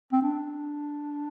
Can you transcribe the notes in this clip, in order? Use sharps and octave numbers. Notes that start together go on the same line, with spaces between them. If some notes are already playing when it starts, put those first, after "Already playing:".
C4
D4